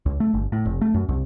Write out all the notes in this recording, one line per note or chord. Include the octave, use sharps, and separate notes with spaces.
C#2
A3
G1
A2
F1
A3
F#2
C2